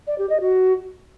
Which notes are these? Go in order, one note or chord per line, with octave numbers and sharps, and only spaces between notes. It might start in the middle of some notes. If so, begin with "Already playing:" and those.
D5
G4
D#5
F#4